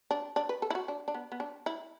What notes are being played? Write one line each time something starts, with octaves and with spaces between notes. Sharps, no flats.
D4
D4
B4
A4
E4
F#4
D4
D4
B3
B3
D4
E4